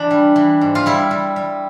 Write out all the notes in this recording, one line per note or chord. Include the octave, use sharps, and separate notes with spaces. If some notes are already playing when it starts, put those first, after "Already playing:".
Already playing: E3 D4
G3
E3
G#2
F4
G3 E4
G3
G3